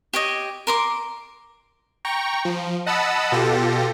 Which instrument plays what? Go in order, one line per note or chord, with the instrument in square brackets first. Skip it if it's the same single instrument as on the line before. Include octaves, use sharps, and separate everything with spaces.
[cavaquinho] G4 C#5 D#5
A#4 C6 D6
[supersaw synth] G5 A#5 C#6
F3
D#5 F#5 A5 B5 E6
B2 F4 G4 A4 A#6